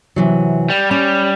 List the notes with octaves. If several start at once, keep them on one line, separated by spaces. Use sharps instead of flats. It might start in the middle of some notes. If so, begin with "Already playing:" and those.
C3 E3 F#3
G3
G3 C#4